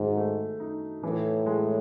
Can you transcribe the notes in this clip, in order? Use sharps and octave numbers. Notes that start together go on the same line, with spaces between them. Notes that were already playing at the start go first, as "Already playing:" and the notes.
Already playing: G#2 D#3 F#3
A3
D#4
A2 E3
G#3